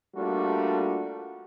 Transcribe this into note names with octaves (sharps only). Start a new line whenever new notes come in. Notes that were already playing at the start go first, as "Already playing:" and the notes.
G3 A3 A#3 D4 F4 F#4